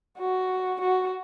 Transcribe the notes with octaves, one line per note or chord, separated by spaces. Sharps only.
F#4
F#4